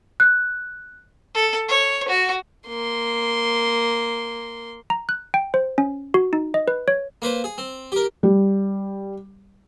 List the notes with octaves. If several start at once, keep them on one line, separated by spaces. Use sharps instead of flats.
F#6
A4
C#5
F#4
A#3 C6
A#5
F#6
G5
C5
C#4
F#4
D#4
D#5
B4
C#5
A#3 B4 C5
G#4
C4
G4 A#4
G3